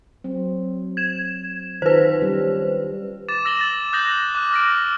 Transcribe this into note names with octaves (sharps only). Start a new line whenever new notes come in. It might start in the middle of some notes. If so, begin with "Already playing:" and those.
F#3 C4
G#6 E7
D#3 F4 G4 B4 C5
G3 C#4
D6 A6 E7
E6 A#6 E7 F#7 G7
A6
D#6 F#6 G6 A#6 F#7
D6 F#6
F6 A#6 D7